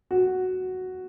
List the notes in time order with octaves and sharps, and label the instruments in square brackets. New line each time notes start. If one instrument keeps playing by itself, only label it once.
[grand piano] F#4